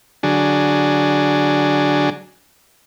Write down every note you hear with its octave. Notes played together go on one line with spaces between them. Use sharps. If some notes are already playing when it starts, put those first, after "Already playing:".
D3 F#3 D4 G#4